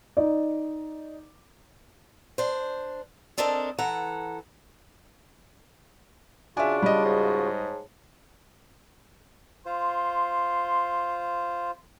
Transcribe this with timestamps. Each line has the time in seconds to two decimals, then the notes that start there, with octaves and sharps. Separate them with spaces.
0.17 D#4 D5
2.38 D4 C5
3.38 C4 D4 A4 A#4 D#5
3.78 E3 A4 F#5 A#5
6.57 C#3 D4 F4 F#4 E5 G#5
6.82 G3 G#4 C#5 D#5 A5
7.05 G#2
9.66 F4 C5 C6